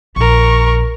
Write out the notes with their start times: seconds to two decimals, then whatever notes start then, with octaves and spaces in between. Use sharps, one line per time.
0.16 A#1 A#4 C#6